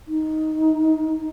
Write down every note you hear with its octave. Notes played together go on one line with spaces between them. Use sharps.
D#4